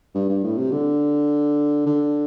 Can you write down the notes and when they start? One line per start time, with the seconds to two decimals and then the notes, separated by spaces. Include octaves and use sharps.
0.15 G2
0.29 G2
0.44 A2
0.58 C3
0.72 D3
1.86 D3